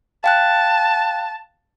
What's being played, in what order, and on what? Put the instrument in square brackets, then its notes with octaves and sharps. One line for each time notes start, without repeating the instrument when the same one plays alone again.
[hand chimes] F5 G5 F#6 [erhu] A5